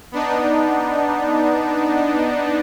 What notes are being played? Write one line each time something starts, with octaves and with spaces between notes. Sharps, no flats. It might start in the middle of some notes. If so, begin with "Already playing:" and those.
B3 D4 D#4